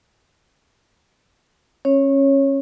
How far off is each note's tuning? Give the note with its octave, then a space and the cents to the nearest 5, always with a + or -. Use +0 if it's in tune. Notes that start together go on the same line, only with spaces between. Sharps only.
C#4 -25 C#5 -5